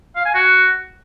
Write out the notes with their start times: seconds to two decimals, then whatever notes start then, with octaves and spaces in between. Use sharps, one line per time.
0.16 F5
0.25 G#5
0.34 F#4